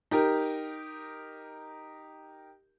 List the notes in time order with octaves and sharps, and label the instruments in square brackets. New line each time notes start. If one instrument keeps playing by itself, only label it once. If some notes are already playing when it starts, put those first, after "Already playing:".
[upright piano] D#4 G4 A#4